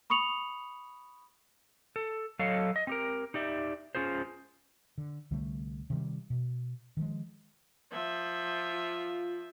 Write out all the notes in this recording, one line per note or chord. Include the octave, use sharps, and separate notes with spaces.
B5 C#6 D#6 C#7 F7 F#7
A4
F#3 A4 C#5 D#5 F5
D#5
C4 G4 A#4
D#4 G4 D5 E5
C#4 F4 G#4 C5
D3
C2 D3 G3 A3
C3 D#3 F#3 G3
B2
D#3 F3 G#3
F3 E5
F4